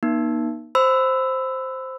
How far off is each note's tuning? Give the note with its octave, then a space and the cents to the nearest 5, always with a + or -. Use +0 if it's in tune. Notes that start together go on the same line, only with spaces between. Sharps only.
A#3 +40 D#4 -10
C5 +0 B5 +35 E6 +0